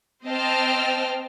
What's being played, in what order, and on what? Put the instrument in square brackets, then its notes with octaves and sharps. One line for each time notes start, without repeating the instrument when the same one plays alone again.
[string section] C4 C5 D#5 G5 A5 F6